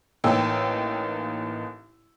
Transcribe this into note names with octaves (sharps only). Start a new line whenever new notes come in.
A1 A#3 D#4 G5 E6